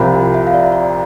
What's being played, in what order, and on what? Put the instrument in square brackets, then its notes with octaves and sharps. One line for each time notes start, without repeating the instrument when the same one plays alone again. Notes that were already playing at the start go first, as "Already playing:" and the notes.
Already playing: [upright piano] C2 C3 F3 [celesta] B5
[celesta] E5
F5
D5
E5
D5